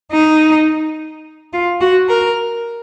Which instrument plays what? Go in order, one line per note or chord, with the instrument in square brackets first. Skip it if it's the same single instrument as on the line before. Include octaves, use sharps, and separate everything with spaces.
[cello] D#4
F4
F#4
A#4